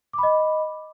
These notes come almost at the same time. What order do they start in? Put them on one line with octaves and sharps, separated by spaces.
D6 B5 D#5